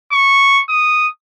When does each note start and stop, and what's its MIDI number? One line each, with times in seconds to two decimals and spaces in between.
0.12 0.62 85
0.70 1.08 87